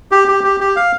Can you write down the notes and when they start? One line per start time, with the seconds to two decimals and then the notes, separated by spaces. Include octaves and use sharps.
0.12 G4
0.28 G4
0.44 G4
0.60 G4
0.76 F5